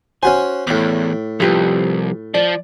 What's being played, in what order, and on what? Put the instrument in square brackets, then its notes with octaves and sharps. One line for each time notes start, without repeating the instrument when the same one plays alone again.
[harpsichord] C#4 F#4 C5 [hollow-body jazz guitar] G#5
[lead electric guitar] E2 [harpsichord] A2 D6
[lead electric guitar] C2 [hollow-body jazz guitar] F3 G4 B4
[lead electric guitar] F3 [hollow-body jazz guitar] D5